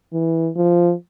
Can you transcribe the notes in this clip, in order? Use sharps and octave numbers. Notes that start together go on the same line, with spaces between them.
E3
F3